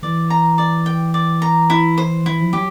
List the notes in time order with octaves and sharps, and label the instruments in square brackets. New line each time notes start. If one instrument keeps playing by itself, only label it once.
[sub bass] E3 [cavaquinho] D5
[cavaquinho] A#5
D5
G5
D5
A#5
E4
C5
[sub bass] E3 [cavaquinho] E4
[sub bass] F3
[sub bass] F#3 [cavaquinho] G4